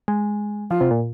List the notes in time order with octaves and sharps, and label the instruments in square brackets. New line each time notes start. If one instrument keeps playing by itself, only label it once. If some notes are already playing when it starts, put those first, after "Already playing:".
[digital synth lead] G#3
[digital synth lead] F3 [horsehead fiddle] F4
[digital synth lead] C3
A#2